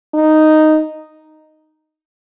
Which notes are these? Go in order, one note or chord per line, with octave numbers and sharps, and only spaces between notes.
D#4